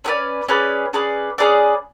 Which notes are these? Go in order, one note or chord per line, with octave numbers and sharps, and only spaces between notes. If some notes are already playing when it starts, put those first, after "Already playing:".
C#4 G#4 B4 D5
C#4 G#4 B4 D5
C#4 G#4 B4 D5
C#4 G#4 B4 D5